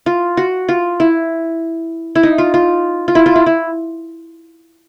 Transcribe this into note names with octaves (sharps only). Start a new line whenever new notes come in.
F4
F#4
F4
E4
E4
D#4
F4
F4
F4
E4
F4
E4
E4